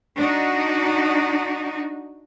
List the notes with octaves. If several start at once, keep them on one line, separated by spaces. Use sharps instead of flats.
D4 D#4 F#4